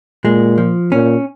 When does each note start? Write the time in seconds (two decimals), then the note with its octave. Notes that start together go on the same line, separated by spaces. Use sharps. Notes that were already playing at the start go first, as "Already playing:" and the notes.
0.24 A#2 G#3
0.58 F3
0.92 A#2 C#4